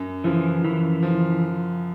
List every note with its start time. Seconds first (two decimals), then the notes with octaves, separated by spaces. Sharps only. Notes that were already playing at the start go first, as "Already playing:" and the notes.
Already playing: F#2
0.24 C#3 E3 F3
0.64 F#2 E3
1.03 C#3 F3